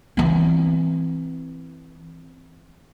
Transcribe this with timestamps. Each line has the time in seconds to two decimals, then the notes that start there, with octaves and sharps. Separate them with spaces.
0.17 E3 C4